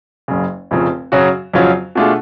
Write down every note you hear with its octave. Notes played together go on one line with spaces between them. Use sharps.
F#1 F#2 C#3
F1 F2 C#3 F3
F#2 C#3 F#3 C#4 F#4
F2 C#3 F#3 C#4 F4
B2 A3 D4 F4 G#4